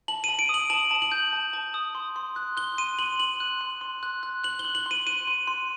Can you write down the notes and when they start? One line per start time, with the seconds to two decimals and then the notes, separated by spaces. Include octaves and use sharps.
0.08 A5 F#7
0.24 A5 D#7
0.39 D7
0.49 D#6 F#7
0.70 A5 F#7
0.91 A5
1.02 F#7
1.12 G6
1.33 A5
1.53 A5
1.74 D#6
1.95 C6
2.16 C6
2.36 F#6
2.57 F#6 G7
2.78 C6 D#7
2.99 C6 F#7
3.19 C6 F#7
3.40 F#6
3.61 C6
3.81 C6
4.03 F#6
4.23 F#6
4.44 F#6 F#7
4.59 G7
4.65 F#6
4.75 F#7
4.86 C6 D#7
5.07 F#6 D#7
5.27 C6
5.47 C6